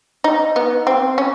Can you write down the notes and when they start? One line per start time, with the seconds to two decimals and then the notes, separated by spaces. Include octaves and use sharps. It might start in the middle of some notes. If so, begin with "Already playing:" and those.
0.24 D#4
0.56 B3
0.87 C4
1.18 C#4